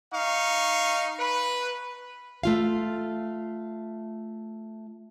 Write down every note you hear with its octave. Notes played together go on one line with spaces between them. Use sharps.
D#4 F5 C#6
B4
A3 F4 F5